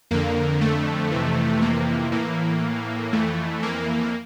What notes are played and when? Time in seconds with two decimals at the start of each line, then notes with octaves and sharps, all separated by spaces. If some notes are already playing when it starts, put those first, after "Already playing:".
0.11 F2 D3 A#3
0.61 A3
1.11 F2 C3 E3
1.62 A#3
2.12 A2 E3 A#3
3.13 F2 E3 A3
3.63 A#3